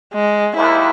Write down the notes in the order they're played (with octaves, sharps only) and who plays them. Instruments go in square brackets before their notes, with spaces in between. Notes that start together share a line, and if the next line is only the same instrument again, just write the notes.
[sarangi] G#3
[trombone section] D#2 [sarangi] E4